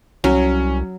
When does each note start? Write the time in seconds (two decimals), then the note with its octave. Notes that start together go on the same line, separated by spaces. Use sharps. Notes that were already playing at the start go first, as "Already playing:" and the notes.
0.24 C2 F#3 C#4